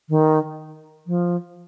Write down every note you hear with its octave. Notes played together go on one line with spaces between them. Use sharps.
D#3
F3